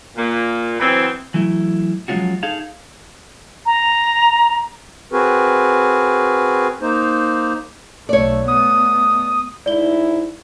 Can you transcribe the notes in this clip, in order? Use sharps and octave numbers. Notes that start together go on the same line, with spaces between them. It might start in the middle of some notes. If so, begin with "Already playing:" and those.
A#2 A#3
E3 F#3 B3 C4
E3 F#3 A3 E4
F3 F#3 G#3 C#4 F4 F#4
D#4 G#4 A4 F5
A#5
C4 F#4 G#4 A#4 B4
A#3 D#4 C5
B1 A3 C#5 D5
A3 B3 D#6
G#2 D#4 E4 D5 G7